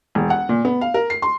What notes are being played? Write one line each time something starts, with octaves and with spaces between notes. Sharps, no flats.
E1
F#5
A#2
B3
F5
A#4
C7
C6